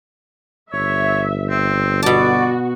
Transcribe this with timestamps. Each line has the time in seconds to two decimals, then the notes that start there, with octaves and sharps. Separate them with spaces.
0.73 G1 C#5 E5
1.50 C4
2.03 B2 F#4 D5 A5